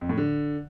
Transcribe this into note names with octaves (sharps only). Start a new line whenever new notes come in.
F2
A2
D3